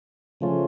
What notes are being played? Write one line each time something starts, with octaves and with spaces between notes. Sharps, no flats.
C#3 F3 A3 C#4 F4